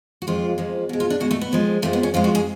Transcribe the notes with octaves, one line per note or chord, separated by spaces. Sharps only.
F#4
F2 F3 G#3 F4
F2 F3 G#3
B2 G#3
F4
D4
B2 G#3 F#4
A3
B3
F2 F3 G#3
F2 F3 G#3 A3
B3
C#4
F2 F3 G#3 F4
F#4
G#4